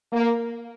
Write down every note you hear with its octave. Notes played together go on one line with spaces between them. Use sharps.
A#3